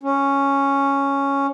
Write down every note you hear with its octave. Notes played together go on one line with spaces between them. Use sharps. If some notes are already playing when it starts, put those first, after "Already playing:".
C#4